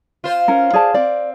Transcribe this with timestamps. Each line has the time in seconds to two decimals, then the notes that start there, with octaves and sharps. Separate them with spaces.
0.24 F4 C5
0.48 C#4 A#4
0.73 G#4 D5 A5
0.94 C4 D5